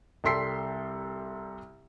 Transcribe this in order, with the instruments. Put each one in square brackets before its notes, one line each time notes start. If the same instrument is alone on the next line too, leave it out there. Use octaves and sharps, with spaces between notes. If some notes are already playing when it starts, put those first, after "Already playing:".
[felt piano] C2 G3 A4 C6 B6 C7